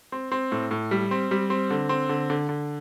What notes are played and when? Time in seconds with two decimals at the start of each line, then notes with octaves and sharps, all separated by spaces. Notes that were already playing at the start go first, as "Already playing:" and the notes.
0.12 C4
0.32 C4
0.52 A2
0.71 A2
0.91 G3
1.11 C4
1.31 G3
1.50 C4
1.70 D3
1.89 C4
2.09 D3
2.30 D3
2.49 D3